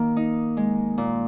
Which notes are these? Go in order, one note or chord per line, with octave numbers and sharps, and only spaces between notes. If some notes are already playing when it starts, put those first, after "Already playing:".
Already playing: D#3 A#3
D#4
G#3
A#2